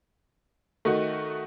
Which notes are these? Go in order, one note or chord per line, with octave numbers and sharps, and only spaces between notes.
D#3 A3 D#4 F#4